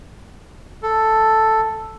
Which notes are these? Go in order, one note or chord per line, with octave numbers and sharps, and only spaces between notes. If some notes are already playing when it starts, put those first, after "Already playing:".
A4